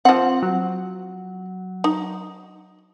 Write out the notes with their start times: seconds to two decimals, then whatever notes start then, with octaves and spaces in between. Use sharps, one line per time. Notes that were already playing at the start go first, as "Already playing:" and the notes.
0.05 F3 C4 F#5
0.42 F#3
1.84 D#4